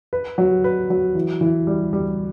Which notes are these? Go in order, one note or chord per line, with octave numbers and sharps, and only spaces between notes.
B4
F#3
B4
F#3
E3
E3
G3
G3